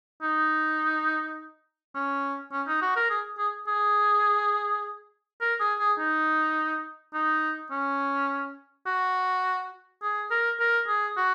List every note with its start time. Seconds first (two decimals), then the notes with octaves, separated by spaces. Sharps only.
0.22 D#4
1.95 C#4
2.52 C#4
2.67 D#4
2.82 F#4
2.96 A#4
3.10 G#4
3.38 G#4
3.68 G#4
5.41 A#4
5.60 G#4
5.79 G#4
5.99 D#4
7.14 D#4
7.71 C#4
8.86 F#4
10.02 G#4
10.31 A#4
10.59 A#4
10.87 G#4
11.17 F#4